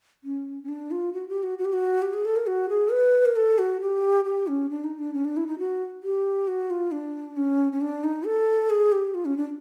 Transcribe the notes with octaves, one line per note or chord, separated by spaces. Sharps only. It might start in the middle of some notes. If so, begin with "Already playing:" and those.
C#4
C#4
D4
F4
F#4
G4
F#4
F#4
G4
F#4
G4
G#4
A4
A#4
F#4
G#4
B4
A#4
A4
F#4
G4
G4
C#4
D4
D#4
D4
C#4
D4
E4
D#4
F#4
G4
F#4
F4
D4
C#4
C#4
D4
D#4
A4
G#4
G4
F4
C#4
D4